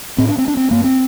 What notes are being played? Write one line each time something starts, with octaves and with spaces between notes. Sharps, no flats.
A2 C4
D4
C4
D4
C4
G2 A#3
C4